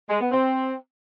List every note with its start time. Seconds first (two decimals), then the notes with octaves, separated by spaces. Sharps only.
0.09 G#3
0.20 B3
0.31 C4